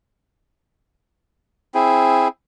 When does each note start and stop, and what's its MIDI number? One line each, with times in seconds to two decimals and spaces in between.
1.74 2.28 60
1.74 2.28 64
1.74 2.28 68